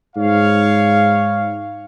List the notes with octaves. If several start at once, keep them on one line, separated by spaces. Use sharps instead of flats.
G#2 C#5 F5